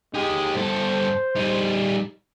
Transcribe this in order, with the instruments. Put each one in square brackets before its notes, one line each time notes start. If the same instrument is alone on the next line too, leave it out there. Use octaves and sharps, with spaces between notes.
[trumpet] G#3 [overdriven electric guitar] D#4 G4
[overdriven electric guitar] G2 A4 [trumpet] C5
[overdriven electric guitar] G3 D#4